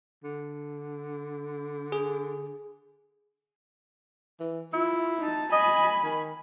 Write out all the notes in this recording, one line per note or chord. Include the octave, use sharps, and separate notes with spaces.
D3
G#4
E3
E4 F4
D#4 A5
D#5 G#5 B5
D#3